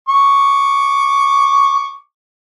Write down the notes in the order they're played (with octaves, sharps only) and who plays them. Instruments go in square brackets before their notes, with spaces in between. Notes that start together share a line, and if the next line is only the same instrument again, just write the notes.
[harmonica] C#6 D6